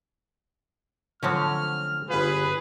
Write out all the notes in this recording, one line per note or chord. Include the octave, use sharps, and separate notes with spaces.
D3 F3 F#3 A3 C4 C#4 F6
G1 F4 G#4 B4